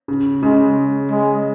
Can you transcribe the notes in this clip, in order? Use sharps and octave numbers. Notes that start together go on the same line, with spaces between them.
C#3
C#3 G#3
G#3